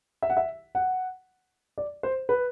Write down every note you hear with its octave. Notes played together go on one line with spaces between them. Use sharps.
E5
F#5
E5
F#5
D5
C5
B4